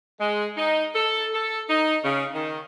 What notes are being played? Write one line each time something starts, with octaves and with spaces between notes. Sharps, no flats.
G#3
D#4
A4
A4
D#4
C#3
D#3